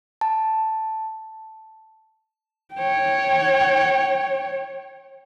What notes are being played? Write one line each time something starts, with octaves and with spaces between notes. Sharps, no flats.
A5
C#5 G5